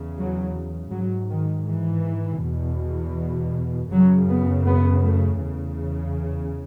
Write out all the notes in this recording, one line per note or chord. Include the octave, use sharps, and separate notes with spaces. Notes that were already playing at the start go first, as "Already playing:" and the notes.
Already playing: E2 C#3
F#3
G#2 F#3
D#3
E3
E2 B2
F#2 C#3 F#3
B3
B3
A3
E2 C#3